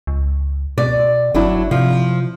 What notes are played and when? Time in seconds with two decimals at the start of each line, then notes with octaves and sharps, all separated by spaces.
0.07 C#2
0.78 B2 D5
1.34 G1 F#3 D4 E4
1.71 C3 F3